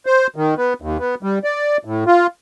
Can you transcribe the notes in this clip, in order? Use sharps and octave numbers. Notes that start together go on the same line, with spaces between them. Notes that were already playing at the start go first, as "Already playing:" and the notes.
C5
D#3
B3
D#2
B3
G3
D5
A2
F4